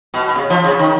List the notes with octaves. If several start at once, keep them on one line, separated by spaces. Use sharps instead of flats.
B2
B2
C#3
F3
C#3
D#3